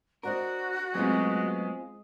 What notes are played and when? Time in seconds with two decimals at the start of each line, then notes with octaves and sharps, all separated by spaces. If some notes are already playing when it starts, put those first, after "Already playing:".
0.23 D4 F#4 A#4 C5 D#5
0.95 F#3 G#3 A3 B3 C4 F4